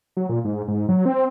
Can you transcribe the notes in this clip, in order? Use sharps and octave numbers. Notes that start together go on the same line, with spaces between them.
F#3
A#2
G#2
G#2
F#3
C4